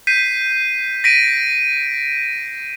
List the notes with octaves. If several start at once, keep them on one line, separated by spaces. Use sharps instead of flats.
G6 B6 C7 D#7
A#6 B6 D7 D#7